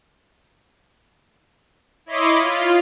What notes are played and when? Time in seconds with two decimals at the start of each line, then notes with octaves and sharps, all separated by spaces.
2.06 E4 C#5 D#5 B5 C6 D6
2.38 F4